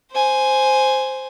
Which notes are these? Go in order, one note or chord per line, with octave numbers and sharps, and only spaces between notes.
C5 G#5